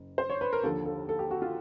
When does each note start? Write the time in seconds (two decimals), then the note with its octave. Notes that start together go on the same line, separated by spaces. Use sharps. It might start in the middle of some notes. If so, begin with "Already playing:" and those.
Already playing: F#1
0.18 C5
0.30 C#5
0.41 B4
0.53 A#4
0.63 D#2 D3 F3 A4
0.86 A4
1.09 A4
1.19 G4
1.31 F#4
1.42 F4